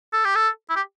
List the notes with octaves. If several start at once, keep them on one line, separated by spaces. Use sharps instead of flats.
A4
G4
A4
E4
G4